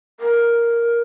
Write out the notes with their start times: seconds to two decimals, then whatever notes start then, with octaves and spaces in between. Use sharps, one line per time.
0.20 A#4